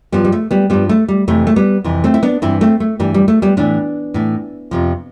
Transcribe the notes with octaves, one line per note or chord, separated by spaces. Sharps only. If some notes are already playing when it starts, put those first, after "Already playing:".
G2 F3 G3 B3
G3
A3
G3 B3
G2 F3 G3 B3
A3
G3
F2 C3 E3 A3
A3
G3 B3
F2 C3 E3
A3 C4
E4
B3 D4
G2 E3 C4 E4
A3 C4
A3
G2 E3 G3
G3
A3
G3 B3
A2 E3 B3 D4
A2 E3
F2 C3 F3